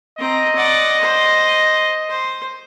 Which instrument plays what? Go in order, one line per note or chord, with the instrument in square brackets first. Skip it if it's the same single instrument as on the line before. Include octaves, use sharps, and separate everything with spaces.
[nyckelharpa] C4 A#5 [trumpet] D#5
[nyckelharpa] D5 F#5
C5
C5